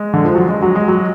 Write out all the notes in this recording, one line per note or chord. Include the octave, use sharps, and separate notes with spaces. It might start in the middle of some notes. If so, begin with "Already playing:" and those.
Already playing: G#3
D3
F3
F#3
G#3
F#3
G#3
F#3